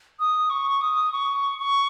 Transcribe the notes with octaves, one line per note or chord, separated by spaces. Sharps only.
D#6
C#6
D#6
C#6
C#6